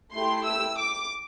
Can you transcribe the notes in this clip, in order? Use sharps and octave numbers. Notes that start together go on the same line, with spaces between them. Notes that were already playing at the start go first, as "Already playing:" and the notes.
A3 E4 G4 C6
E6
D6